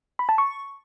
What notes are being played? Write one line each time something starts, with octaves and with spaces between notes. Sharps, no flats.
B5
A5
C#6